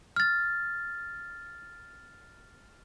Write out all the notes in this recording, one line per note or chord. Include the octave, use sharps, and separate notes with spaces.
F6 A6